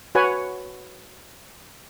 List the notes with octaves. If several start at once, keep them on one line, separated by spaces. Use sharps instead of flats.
F#4 B4 C#5 F#5 G#5